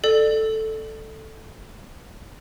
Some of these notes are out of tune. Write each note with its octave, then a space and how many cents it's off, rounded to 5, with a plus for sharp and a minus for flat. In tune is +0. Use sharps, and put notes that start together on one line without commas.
A4 +0 D5 +30